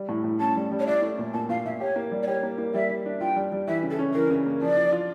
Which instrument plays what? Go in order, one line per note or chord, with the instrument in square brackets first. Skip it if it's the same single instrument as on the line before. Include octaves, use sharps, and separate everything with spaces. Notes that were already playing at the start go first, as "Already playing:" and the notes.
Already playing: [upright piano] G3
A2
A2
[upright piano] C#4 [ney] A5
[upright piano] G3
G3
[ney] C#5
[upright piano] E4 [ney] D5
[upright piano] A3
A#2
[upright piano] A#2 [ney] A5
[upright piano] A#2 [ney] F5
[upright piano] A#2 [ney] E5
[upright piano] G4 [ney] C#5
[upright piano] A#3
G3
[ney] D5
[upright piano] G4 [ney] C#5
[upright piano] A#3
A#3
[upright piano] G3 [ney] E5
[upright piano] G3
D4
[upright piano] F4 [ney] G5
[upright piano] G3
G3
[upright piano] E3 [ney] E5
[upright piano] C#3
[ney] A4
[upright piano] C#4
[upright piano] E3 [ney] A#4
[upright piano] C#3
A#3
[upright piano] F3 [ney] D5
[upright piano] F3
F4